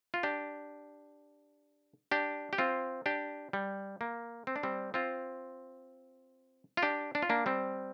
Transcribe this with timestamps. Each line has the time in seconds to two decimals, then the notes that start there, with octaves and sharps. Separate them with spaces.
0.14 F4
0.23 D4 G4
2.11 D4 G4
2.53 G4
2.58 C4 F4
3.06 D4 G4
3.53 G3
4.01 A#3
4.47 C4
4.56 D4
4.63 G3 C4
4.94 C4 F4
6.77 F4
6.83 D4 G4
7.15 D4
7.22 F4
7.30 A#3 D4
7.46 G3 C4